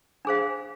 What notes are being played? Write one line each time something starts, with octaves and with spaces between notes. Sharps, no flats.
D4 G#4 C5 F5